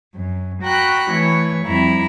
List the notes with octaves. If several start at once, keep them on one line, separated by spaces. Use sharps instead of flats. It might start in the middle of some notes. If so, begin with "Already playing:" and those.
F#2
F#4 G5 A#5 B5 F#6
E3 A3 C#5
F2 G3 E4 A#5